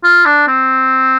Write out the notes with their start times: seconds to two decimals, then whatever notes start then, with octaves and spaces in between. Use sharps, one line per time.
0.04 F4
0.26 D4
0.47 C4